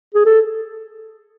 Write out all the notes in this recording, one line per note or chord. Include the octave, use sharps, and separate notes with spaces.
G#4
A4